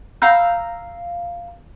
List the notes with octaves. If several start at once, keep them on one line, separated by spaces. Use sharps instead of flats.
F5 A#5 E6 G6